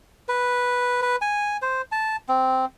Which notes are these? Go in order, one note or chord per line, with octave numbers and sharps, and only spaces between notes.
B4
B4
G#5
C5
A5
C4